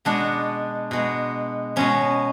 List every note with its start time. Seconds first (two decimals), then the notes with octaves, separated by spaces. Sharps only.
0.05 B2 G#3 B3 D4
0.91 B2 G#3 B3
1.76 B2 G#3 B3 C#4